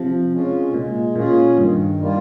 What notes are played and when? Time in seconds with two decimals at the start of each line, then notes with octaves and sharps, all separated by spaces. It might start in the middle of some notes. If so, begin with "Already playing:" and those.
Already playing: C3 F3
0.32 G#3 C#4 F4
0.74 A#2 G#3
1.15 A#2 C#4 F4 G#4
1.58 G2 D#3
1.99 G3 A#3 F4